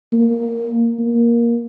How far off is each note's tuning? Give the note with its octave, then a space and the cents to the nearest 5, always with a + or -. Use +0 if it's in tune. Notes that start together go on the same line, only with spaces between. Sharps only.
A#3 -5
A#3 +10